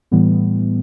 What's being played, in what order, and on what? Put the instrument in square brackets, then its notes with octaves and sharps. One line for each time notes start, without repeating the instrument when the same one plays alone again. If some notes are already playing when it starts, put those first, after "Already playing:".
[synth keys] A2 E3 G3 B3